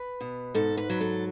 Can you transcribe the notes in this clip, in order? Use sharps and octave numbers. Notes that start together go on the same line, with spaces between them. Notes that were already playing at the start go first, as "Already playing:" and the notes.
Already playing: B4
B2
G#2 A4
B4
F#3
A4